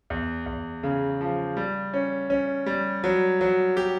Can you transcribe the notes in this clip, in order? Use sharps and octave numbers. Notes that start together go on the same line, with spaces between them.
E2
E2
C#3
F3
G3
C#4
C#4
G3
F#3
F#3
G4